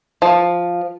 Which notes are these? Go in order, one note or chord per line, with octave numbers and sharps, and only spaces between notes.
F3